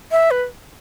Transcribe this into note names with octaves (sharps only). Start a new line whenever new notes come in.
E5
B4